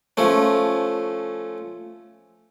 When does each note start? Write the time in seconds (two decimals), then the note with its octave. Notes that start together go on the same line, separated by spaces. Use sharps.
0.17 F3 A3 C#4